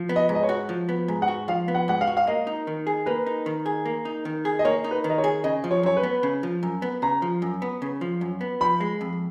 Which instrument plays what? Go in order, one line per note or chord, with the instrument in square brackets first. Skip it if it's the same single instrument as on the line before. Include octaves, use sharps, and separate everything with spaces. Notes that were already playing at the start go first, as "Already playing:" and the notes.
Already playing: [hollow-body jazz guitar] F3
B3
[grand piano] D#5
[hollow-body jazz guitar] G#2
[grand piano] D#5
C#5
[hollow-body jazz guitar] F#4
F3
B3
G#2
[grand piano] F#5
[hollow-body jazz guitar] F#4
[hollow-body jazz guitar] F3 [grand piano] F5
[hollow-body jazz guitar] B3
[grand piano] F#5
[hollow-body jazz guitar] G#2 [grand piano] F#5
[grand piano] F5
[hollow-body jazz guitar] F#4
[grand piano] F5
[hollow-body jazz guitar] A#3 [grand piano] D#5
[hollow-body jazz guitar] D#4
D#3
G#4
[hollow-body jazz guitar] A#3 [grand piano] B4
[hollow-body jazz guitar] D#4
D#3
G#4
A#3
D#4
D#3
G#4
[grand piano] D#5
[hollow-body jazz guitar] A#3 [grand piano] C#5
[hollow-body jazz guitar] D#4
[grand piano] B4
[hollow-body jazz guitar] D#3
[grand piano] D#5
C#5
[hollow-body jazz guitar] G#4
[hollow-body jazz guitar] C#3 [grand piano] D#5
[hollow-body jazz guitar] F3
[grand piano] C#5
[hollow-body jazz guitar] F#2 [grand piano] C#5
[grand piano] B4
[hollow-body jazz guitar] B3
C#3
F3
F#2
B3
[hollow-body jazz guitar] C#3 [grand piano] A#5
[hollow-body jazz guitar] F3
F#2
B3
C#3
F3
F#2
B3
[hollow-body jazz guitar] F3 [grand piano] B5
[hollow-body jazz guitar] G#3
F2